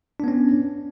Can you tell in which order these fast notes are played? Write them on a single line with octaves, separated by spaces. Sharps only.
D4 B3 C#4